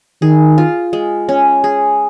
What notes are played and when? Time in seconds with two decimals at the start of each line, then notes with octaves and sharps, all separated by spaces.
0.22 D#3 G#4
0.58 F4
0.93 G#3
1.29 C#4
1.64 G#4